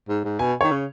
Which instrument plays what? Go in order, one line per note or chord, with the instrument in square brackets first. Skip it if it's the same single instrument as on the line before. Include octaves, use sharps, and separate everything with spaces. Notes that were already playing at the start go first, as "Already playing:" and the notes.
[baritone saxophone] G#2
G#2
[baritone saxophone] B2 [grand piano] G#5
[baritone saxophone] D#3 [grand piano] C#5
[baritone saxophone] C#3